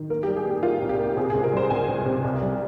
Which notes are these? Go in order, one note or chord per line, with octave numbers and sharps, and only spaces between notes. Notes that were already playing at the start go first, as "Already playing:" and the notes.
Already playing: D#3
A#3 A#4
G3 G4
G#4
A#3
G4
A#3 F4
C2
G4
A#3
C3 G#4
C#2 G#4
A#4
G3 C5
C#2 G#5
C#2
C3
C2
G3